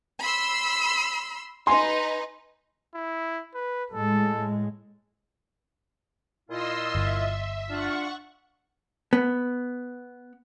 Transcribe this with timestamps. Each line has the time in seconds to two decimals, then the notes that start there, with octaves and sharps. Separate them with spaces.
0.20 B5 C6 E6
1.67 D#4 B4 G#5 C6
2.95 E4
3.54 B4
3.90 A2 G#3 A4
6.49 A#2 E4 F4 D#5 C6 E6
6.95 G1 E5
7.70 D4 F4 F#5 C#6
9.13 B3